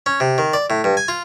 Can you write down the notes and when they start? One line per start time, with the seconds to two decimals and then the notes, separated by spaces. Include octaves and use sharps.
0.06 C#4
0.20 C3
0.38 D#3
0.53 D5
0.70 A2
0.84 G2
0.97 G#5
1.08 F4